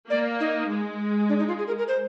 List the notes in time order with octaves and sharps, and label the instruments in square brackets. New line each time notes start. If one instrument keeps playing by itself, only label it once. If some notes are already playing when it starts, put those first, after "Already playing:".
[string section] A#3 [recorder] D5
[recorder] D#4
[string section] G#3
[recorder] D4
D#4
F4
G#4
A#4
A#4
C5